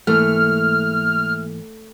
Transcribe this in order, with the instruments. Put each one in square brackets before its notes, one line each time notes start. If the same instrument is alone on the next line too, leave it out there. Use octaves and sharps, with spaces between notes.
[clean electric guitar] G#2 E3 A#3 [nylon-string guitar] A3 [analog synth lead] F6